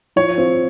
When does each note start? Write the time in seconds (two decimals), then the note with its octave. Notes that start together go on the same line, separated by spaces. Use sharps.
0.16 F3 C#5
0.38 C4 F4